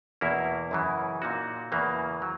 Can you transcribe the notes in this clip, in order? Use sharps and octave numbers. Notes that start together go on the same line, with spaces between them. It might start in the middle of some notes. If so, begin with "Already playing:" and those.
E2 B2 A#3 E4
F#2 C#3 E3
A#2 A#3 D#4 F#4
E2 C#3 E3 A#3 C#4
F#3